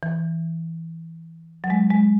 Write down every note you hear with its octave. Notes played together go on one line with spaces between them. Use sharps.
E3
F#3
G#3
G#3